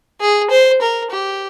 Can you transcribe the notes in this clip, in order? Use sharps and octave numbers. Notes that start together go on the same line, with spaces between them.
G#4
C5
A#4
G4